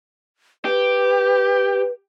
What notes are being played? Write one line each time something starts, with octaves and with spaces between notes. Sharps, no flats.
G4 B4